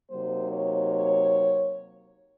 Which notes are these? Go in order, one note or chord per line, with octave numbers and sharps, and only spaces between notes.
C3 F#3 A#3 D#4 C5
C#5
C#5